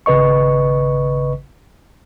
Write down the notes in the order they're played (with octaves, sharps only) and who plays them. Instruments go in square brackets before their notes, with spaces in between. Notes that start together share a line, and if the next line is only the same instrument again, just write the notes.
[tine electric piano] G#1 C#3 B4 D#5 C#6